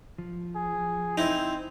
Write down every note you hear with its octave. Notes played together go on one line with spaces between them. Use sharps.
F3
G#4
C4 D#4 E4